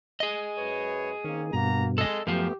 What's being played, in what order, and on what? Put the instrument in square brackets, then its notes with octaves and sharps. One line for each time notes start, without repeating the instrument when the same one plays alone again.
[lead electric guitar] G#4 D#5
[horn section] F#2 B4 C#5
[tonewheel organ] D#3 [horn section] A#3 C4 C#4
[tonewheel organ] G2 B2 [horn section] A#3 F#4 A#5
[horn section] G#3 [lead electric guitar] A4 D#5
[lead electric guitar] F#2 F3 [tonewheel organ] A3 B3 [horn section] G4